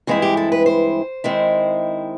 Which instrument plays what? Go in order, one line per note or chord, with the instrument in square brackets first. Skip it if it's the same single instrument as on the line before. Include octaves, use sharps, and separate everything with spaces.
[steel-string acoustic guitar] G2 E3 G#3 C4 E4 F#4
G4
A4
B4
C5
D#3 G#3 C4 E4